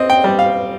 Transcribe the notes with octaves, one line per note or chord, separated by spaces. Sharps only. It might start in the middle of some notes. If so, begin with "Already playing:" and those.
Already playing: C4 D#5
G5
G3
F5